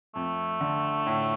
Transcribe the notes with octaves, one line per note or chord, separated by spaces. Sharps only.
F2 A3
D3
A2